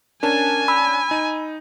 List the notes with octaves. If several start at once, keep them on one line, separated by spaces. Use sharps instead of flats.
C#4 D4 A#4 G#5 A5
B5 E6
D#4 D#7